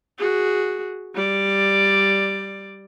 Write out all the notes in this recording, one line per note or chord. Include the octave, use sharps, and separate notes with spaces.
F#4 G#4
G3 D5